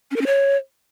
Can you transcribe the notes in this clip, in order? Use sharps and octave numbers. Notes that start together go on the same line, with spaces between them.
C#4
A#4
C#4
C#5